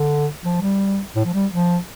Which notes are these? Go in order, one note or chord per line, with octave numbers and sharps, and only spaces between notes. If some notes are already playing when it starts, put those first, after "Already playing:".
Already playing: D3
F3
G3
A2
F3
G3
F3